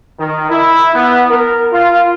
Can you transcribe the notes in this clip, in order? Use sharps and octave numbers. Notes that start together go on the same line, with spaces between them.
D#3
E4
B3
A#4
F4